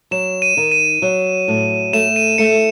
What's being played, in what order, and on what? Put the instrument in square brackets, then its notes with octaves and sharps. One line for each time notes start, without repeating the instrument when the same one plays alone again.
[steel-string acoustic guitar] F#3 [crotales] E7
[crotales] D#7
[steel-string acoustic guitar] D#3
[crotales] D#7
[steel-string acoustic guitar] F#3
A2
[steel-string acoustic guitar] A3 [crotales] E7
[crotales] D#7
[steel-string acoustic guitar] A3 [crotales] C#7